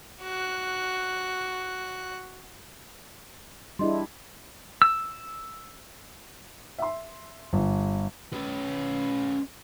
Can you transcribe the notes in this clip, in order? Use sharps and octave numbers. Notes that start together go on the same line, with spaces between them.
F#4 F#6
G3 D4 E4 G#4 D#5 C6
E6
E5 C6
G1
C#4 B4